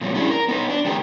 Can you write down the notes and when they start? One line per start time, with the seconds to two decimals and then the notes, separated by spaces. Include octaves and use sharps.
0.01 A#2 F#3 G3 B3
0.14 C#4 D4 E4 G#4
0.31 A#4
0.48 B3 D#4 B4
0.69 D4
0.85 C3 D#3 A3 B3 G4 A#4